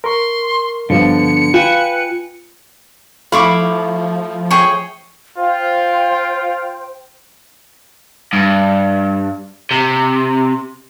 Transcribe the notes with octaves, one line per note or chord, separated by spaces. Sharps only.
A#4 C6 C#6
G2 D3 F3 B3 C#7
F4 B4 G5 G#5
F3 A3 E4 F5 B5 C#6 D6
G#4 C#5 G5 C#6
F4 C5 G5
G2
C3